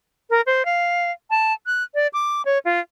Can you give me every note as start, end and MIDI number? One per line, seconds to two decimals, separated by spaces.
0.30 0.41 70
0.46 0.65 72
0.65 1.11 77
1.30 1.53 81
1.66 1.83 90
1.95 2.07 74
2.13 2.42 86
2.45 2.58 73
2.65 2.79 65